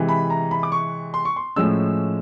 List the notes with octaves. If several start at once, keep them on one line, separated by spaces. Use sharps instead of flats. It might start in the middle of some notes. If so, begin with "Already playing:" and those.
Already playing: C3 E3 G#3
B5
A#5
B5
D6
C#6
C6
C#6
C6
A2 F3 G#3 C#4 E6